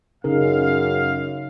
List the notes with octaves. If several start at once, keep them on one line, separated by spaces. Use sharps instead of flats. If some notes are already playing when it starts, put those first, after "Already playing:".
F#2 C#3 C#4 D#4 G#4 A#4 F5